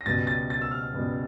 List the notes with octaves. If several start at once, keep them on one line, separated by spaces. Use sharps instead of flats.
A#6
C#2 B2 G3 B3 A6
A6
A6
E6
F6
C#2 B2 G3 B3